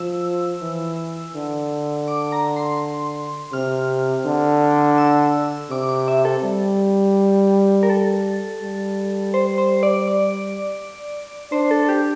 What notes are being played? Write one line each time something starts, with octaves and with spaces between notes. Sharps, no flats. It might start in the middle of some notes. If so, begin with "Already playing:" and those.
Already playing: F3 E6
E3
D3
D6
A#5
C6
C3 F6
D3
E6
C3 D6
D6
E5
A4
G3
A#4
A4
G3
C5
C5
D5
D5
D4 C5
A4
G4